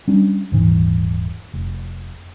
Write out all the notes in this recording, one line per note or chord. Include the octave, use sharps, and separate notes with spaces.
G3 C#4 D4
D#1 G#2 E3
F1